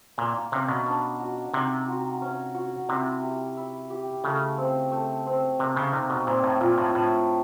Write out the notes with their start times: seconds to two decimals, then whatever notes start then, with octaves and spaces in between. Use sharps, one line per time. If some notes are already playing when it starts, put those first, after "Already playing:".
0.18 A#2 A#3
0.52 C3 C#4
0.68 B2
0.86 D4
1.19 F#4
1.53 C3 D#4
1.88 F#4
2.22 C#4
2.55 F#4
2.89 C3 E4
3.23 G4
3.57 E4
3.90 G4
4.24 C#3 A3
4.58 C4
4.91 A3
5.26 C4
5.59 C3 A#3
5.77 C#3
5.93 C3 D#4
6.10 B2
6.27 A#2 C4
6.44 A2
6.61 A#2 F4
6.78 A2
6.95 A2 D4